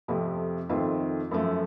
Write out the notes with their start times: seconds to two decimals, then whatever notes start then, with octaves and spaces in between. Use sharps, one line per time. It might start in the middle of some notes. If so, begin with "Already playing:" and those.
0.08 F2 C3 F3 A3
0.69 F2 D#3 A3 C4 F4
1.31 F#2 F3 A3